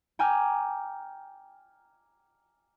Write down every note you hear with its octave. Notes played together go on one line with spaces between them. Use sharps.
G5 G#5 A#5 D6 F6